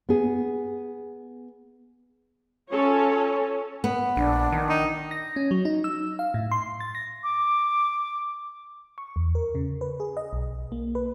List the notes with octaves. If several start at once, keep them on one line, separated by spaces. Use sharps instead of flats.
B3 G#4
C#4 F4 A4 C#5
B3
A#1 D4
D#3
D#4
A#6
C#4
F#3
D#4
E6
F5
A2
C6
A6
A#6
D6
C#6
E2
A#4
C#3
B4
G#4
D#5
B1
A#3
B4